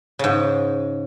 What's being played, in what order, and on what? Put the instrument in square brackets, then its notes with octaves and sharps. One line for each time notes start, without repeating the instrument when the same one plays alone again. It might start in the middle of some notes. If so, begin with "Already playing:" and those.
[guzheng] G#2 C#3